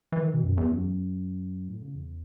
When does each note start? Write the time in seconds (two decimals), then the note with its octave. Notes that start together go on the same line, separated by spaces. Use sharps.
0.12 E3
0.23 D#3
0.34 B2
0.43 F#2
0.57 E2
0.71 F#2
1.68 A2
1.82 C#3
1.95 E2